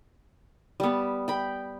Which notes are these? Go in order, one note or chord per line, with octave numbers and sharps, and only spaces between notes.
G3 B3
G5 B5